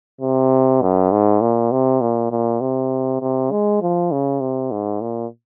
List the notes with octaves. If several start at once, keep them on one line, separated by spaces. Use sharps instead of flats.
C3
F#2
G#2
A#2
C3
A#2
A#2
C3
C3
G#3
F3
C#3
C3
G#2
A#2